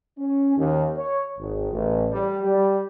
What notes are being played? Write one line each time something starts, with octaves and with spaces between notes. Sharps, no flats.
C#4
D#2
C#5
G#1
A1
G3
G3